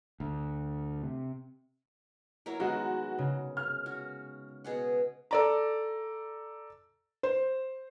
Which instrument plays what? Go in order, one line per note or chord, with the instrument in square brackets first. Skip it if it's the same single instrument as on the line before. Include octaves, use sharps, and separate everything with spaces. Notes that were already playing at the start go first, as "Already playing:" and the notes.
[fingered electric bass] D2
C3
[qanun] F#3 E4 A#4
[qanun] D#3 [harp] G#3 B3 [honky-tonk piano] F#4
[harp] C#3
[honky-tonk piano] F6
[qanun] F#4
B2 G#4 F#5
[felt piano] A4 D5 A#5
C5